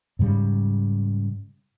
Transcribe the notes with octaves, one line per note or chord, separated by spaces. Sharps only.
G#2 C#3 G3